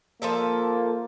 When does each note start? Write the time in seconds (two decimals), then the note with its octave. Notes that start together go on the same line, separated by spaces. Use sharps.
0.22 F3 A#3 A4 E5